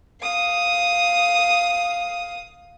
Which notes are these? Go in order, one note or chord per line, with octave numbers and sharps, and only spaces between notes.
F5 D#6